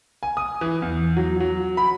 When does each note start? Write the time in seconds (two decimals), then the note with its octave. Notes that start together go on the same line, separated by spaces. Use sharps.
0.23 G#5
0.37 D#6
0.61 E3
0.82 E2
1.17 F#3
1.40 F#3
1.77 B5